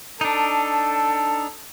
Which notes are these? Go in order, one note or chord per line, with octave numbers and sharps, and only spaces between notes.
D4 D#4 A4